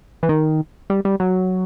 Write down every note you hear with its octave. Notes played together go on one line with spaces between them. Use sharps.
E3
D#3
G3
G3
F#3